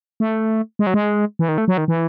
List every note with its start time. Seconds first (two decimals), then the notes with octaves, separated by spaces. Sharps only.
0.20 A3
0.79 G#3
0.87 F#3
0.94 G#3
1.39 E3
1.49 D#3
1.58 A3
1.68 F#3
1.78 D#3
1.88 E3